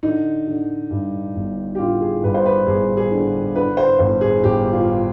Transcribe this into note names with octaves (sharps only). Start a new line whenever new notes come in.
D3 D#4
D3
G2
G1
G4
D3 F4
G#4
G2 B4
C5
B4
G1 G#4
G#4
D3
D3 B4
C5
G1 C5
G#4
G1 G4
F4